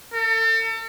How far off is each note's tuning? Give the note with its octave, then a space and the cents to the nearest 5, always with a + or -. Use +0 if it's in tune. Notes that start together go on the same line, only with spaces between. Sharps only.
A4 +40